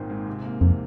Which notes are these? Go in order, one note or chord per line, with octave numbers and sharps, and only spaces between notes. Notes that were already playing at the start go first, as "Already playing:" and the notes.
Already playing: G#1 A#2 D#3 C4
G#2
C3
A#3
F2 C3